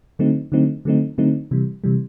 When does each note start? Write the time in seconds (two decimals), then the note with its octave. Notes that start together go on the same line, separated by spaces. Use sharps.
0.19 D3 F#3 A3 C4 D#4
0.52 D3 F#3 A3 C4 D#4
0.85 D3 F#3 A3 C4 D#4
1.18 D3 F#3 A3 C4 D#4
1.51 C3 E3 G3
1.84 C3 E3 G3